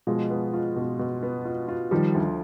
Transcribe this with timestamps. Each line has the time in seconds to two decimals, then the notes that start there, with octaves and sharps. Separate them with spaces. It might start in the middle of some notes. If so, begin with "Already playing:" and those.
0.07 B2 F3 G#3
0.30 B3
0.54 F4
0.76 B2
0.99 B2
1.23 B3
1.45 F4
1.68 F4
1.91 D#3 F3 G3
2.15 D2